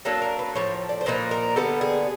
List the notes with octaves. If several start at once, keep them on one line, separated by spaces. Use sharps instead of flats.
F#3 A#3 D4 A4
A#4
B4
A2 F3 C#5
D5
C5
A#2 F3 A#3 D#4 B4
A#4
D3 G3 B3 A4
G#4